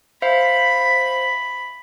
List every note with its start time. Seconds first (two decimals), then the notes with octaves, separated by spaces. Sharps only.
0.22 C5 E5 F5 B5